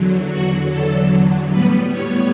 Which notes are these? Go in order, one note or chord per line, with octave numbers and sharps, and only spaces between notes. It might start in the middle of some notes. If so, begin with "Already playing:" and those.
Already playing: E2 D3 F#3
F#4
A4
A2 G3 B3 B4
C#5